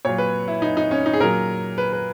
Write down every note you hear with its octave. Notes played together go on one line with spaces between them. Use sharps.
A#2 F#3 C#5
B4
E4
D#4
D#4
C#4
D#4
G#4
A#2 F#3 A#4
B4
B4